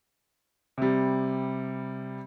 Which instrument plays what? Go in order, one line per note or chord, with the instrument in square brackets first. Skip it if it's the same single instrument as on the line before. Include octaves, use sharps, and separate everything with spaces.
[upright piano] C3 G3